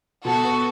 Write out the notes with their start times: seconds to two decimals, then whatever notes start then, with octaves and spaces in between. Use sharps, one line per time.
0.24 B2 F#4 A4
0.45 B3